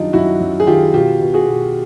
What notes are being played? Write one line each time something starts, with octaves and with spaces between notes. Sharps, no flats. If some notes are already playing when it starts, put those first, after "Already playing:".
Already playing: F#2 D#3 G3 D4 D#4 F4
F#2 E4 F#4
F#2
G#4
D#3 F4 G4
B2 F4 G4
B2
F#4 G#4
B2